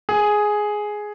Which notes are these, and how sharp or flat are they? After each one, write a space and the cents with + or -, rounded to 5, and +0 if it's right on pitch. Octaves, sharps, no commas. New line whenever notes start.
G#4 +5